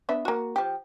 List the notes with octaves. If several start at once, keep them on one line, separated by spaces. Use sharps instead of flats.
B3 D4 E5
A#3 F#4
F3 G4